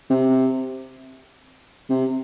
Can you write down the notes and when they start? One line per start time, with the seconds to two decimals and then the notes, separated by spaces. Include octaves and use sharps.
0.10 C3
1.90 C3